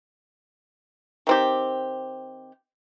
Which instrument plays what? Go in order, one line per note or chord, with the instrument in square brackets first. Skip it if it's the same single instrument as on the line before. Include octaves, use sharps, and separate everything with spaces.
[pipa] D#3 C4 G4